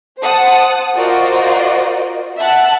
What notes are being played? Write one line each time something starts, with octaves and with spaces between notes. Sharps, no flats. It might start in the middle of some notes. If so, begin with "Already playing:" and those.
C5 F#5 A5 D#6
F4 F#4 A#4 C5 D5 D#5
E5 F#5 A5 F#6